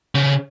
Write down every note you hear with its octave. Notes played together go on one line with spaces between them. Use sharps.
C#3